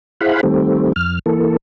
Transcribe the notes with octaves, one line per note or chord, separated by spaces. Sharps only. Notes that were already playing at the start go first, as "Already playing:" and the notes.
E4 G#4 C5 F5 F#5 B5
D#3 G3 A3 C4
F2 F6
E3 A#3 A4